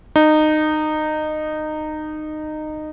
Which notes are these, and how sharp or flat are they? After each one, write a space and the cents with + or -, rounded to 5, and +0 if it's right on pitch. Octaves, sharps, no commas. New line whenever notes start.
D#4 -20